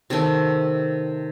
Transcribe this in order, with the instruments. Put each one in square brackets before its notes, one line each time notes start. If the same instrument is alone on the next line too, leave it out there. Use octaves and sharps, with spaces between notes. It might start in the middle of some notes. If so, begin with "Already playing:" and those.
[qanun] C3 D#3 A3